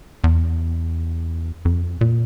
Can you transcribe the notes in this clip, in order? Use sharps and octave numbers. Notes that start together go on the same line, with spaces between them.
E2
F2
A#2